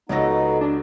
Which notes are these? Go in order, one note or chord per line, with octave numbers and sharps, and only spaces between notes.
C#2 B3 D#4 F#4 A4 C#5 D5 A#6
D4